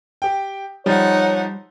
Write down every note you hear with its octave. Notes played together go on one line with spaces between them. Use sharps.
G4 G5
F3 G3 D#4 C#5 F#5